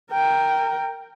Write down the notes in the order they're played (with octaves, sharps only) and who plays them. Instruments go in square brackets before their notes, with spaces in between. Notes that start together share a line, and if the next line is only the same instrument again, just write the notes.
[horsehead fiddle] A#4 G5